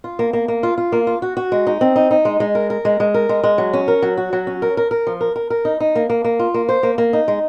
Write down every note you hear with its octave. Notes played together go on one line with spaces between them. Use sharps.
F4
A#3
A#3
A#3
F4
F4
A#3
F4
F#4
F#4
G#3
D#4
C4
D#4
D#4
G#3
G#3
A#4
A#4
G#3
G#3
A#4
G#3
G#3
F#3
C#4
A#4
F#3
F#4
F#3
C#4
A#4
A#4
A#4
F3
A#4
A#4
A#4
D#4
D#4
A#3
A#3
A#3
F4
A#3
C5
A#3
A#3
D#4
G#3